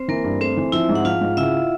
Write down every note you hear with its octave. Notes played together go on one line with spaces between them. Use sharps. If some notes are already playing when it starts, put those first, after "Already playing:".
Already playing: C4 C5
E3 A#3 A#4
G2
A3 C4 C5
E3
F3 E4 E5
G#2
F#5
F3 F4 F5
G#2
C#3 E4 E5